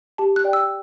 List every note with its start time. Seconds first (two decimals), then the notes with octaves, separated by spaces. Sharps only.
0.18 G4 A5
0.36 F#6
0.44 D5 G5
0.53 E6